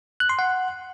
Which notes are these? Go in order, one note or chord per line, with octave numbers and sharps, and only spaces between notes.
F#6
C6
F#5